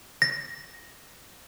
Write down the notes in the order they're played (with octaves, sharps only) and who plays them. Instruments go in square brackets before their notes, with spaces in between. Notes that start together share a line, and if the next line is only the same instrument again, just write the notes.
[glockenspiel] A#6